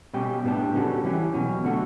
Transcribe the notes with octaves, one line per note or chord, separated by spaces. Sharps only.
B2 G3 C#4 G4
A2 G3 B3 D4 G4
C#3 G3 C#4 F#4 A4
E3 G3 C#4 G4
B2 F#3 C#4
D3 A3 D4 F#4